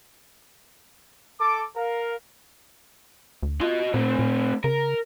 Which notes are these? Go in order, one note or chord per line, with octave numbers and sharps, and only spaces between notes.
A4 D6
A#4 F5
D2
F4 F#4 D#5
A#2 A3 C4
A#2
C#3 A#4